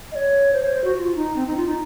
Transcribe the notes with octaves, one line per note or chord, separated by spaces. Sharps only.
D#5
C#5
C5
C#5
C5
F#4
F#4
F4
D#4
C4
D#4
F4
D#4